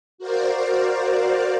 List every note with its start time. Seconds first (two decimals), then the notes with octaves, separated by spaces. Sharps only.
0.18 F#4 A#4 C5 D5 F5